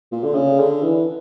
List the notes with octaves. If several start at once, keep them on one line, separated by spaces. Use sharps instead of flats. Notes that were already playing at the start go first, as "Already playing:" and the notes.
A#2
D3
C#3
D3
E3